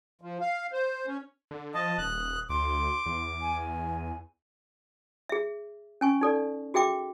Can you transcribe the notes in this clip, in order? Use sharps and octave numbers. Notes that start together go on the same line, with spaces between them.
F3
F5
C5
C#4
D3
F3 D#5 A5 D#6
D#1 F#6
D2 C6 D6
E2
G#5
G#4 E5
C#4 G#5 C#6
D#4 A4 D5
F#4 G#4 E5 G5 D6